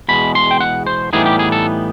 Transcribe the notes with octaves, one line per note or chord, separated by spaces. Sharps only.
E2 B2 G#3 B5
C6
G5
F#5
C5
A2 E3 G3 B3 D#4 G#4
G4
G#4
A4